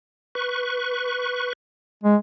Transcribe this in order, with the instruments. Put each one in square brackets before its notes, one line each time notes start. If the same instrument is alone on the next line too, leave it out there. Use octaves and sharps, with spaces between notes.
[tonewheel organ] B4 C#6
[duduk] G#3